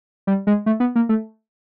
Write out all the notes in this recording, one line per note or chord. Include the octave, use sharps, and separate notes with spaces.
G3
G#3
A3
B3
A#3
A3